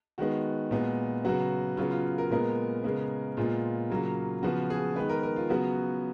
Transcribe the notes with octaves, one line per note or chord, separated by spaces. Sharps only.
D#3 G#3 B3 F#4
A#2 G#3 B3
C#3 F#3 B3 F#4
C#3 F#3 B3 F4
F4
A#4
A#2 G#3 B3 A#4
C#3 G#3 B3
A#2 G#3 B3 F4
C#3 F#3 A#3
C#3 F3 B3 F#4
G#4
D#3 G#3 B3 B4
A#4
A#4
F4
C#3 F#3 B3 F#4